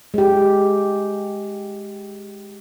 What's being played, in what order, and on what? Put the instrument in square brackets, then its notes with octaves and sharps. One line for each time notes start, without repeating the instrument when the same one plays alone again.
[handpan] G#3 G4